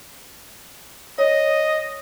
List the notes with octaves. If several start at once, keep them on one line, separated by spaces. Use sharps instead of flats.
C#5 D#5